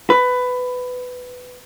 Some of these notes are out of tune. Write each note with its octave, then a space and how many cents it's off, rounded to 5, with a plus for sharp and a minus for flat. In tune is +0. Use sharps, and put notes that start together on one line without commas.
B4 +15